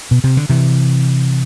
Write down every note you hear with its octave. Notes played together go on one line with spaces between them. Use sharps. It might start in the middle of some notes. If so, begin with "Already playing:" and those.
B2
C3
D3
C3 E3